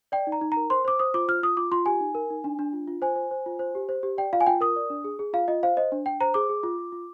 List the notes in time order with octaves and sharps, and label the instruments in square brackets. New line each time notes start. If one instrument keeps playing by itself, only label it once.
[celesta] D5 G5
D#4
A#5
D#4
A#4 A#5
C5 C6
C5 D6
C5 D#6
F4 D6
F4 F6
F4 D#6
F4 D6
F4 C6
G4 G#5
D#4
A#4
D#4
D4
D4
F4
F4
C5 G#5
C5
C5
F4
C5
G4
C5
G4
D5 G5
F4 F5
G#5
F4 G5
A#4 D#6
D5
D4
G#4
G#4
F4 F5
F4 D#5
C5 F5
C5 D#5
D4
D4 G5
C5 A#5
G#4 D6
G#4
F4
F4
F4